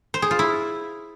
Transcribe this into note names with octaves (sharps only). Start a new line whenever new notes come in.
C5
G#4
F4
E4